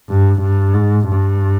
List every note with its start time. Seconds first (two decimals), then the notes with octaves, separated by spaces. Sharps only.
0.09 G2
0.42 G2
0.74 G#2
1.07 G2